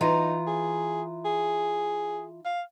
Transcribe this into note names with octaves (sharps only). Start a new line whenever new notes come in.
E3 D#4 F4 A#5
G#4
G#4
F5